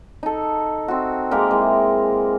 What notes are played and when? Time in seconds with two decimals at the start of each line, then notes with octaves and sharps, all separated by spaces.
0.23 D#4 A4
0.88 C4 F#4
1.31 G#3 A#3 G4 A#4
1.51 E3 G#3